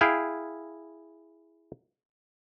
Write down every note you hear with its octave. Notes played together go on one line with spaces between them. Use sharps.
E4 G#4 F5 G5